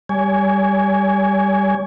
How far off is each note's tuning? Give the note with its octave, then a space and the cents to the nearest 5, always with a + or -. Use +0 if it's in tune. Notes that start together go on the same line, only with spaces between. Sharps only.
G3 +5 C#5 +40 G#5 +0